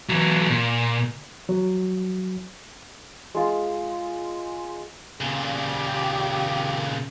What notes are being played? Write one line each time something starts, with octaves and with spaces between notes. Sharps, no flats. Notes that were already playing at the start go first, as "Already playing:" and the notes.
E3 F#3
A#2
F#3
G#3 F4
A#2 C#3 G4